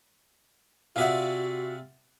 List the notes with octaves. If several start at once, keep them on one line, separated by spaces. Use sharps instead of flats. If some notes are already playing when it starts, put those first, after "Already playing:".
C3 F4 F#4 G#4 D5 E5 F#5